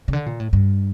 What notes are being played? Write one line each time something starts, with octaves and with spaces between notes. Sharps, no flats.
C#3
D3
A#2
A2
G2